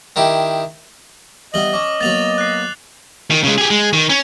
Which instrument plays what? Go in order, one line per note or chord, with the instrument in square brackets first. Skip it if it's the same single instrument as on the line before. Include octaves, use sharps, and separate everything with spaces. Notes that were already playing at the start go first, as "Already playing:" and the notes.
[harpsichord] D#3 D#4 E4 G4
[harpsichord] E3 G3 B3 [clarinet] D#5 [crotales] F#7 G7
[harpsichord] C#4 [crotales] D6
[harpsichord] F#3 A#3 B3 [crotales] A6 F7 F#7
[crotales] F#6 C7
[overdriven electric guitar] D#3
C#3 G#3
G4 G#4
G#3
D#3
C#4